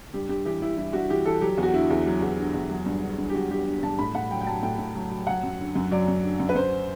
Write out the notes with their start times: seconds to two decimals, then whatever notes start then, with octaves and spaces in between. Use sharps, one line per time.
0.14 G2 G4
0.29 G2 G4
0.45 E3 G4
0.62 E3 E4
0.77 G2 E4
0.93 G2 F#4
1.10 E3 G4
1.25 E3 A4
1.41 F#3 G4
1.57 E2
1.63 F#4
1.74 D3 E4
1.90 E2
2.06 F#3
2.21 E2
2.38 D3
2.54 E2
2.70 F#3
2.86 G2
3.03 D3
3.18 G2
3.30 G4
3.34 F#3 F#4
3.50 G2 G4
3.67 D3
3.83 G2 A5
3.99 A2 B5
4.15 A2 F#5
4.31 F#3 G5
4.41 G5
4.47 F#3 A5
4.63 A2 G5
4.78 A2
4.95 F#3
5.11 F#3
5.27 F#3 F#5
5.43 F#2
5.59 D3
5.75 F#2
5.91 F#3 D5
6.08 F#2
6.23 D3
6.40 F#2
6.49 B4
6.55 F#2 C5